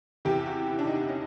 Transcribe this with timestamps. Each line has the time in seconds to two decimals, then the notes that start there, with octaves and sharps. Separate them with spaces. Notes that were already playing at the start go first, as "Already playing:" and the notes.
0.25 E2 C3 E3 G4
0.46 F#4
0.67 E4
0.79 D4
0.87 D#4
1.09 C#4